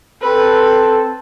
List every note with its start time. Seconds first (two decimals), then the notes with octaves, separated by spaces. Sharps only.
0.22 C4 A4 B4